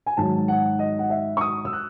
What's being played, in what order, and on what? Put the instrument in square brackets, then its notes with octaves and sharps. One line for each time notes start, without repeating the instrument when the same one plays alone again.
[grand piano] G#5
G#2 D#3 F#3 A5
F#5
D#5
F#5
E5
C#6
D#6
E6
F#6